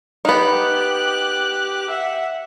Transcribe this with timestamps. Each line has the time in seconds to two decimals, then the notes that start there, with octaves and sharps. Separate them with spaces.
0.25 B3 D#4 G4 F#6
1.89 E5 F#5